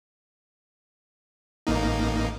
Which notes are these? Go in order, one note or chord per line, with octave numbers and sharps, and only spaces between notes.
A1 A#3 D#4